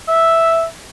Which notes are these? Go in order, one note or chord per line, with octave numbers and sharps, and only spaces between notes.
E5